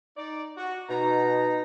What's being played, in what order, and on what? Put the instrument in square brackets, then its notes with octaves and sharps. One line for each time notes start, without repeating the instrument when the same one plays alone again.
[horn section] D#4 D5
F#4
[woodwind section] B2 [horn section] D#4 A#5